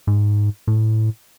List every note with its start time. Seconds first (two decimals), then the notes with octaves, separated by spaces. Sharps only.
0.07 G#2
0.67 A2